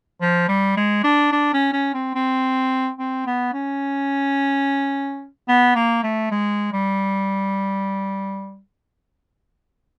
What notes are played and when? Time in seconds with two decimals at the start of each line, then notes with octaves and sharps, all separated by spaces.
0.21 F3
0.48 G3
0.77 G#3
1.04 D4
1.32 D4
1.53 C#4
1.73 C#4
1.94 C4
2.15 C4
2.99 C4
3.26 B3
3.53 C#4
5.48 B3
5.75 A#3
6.03 A3
6.31 G#3
6.73 G3